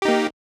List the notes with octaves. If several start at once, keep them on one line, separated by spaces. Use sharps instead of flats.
A#3 D#4 G4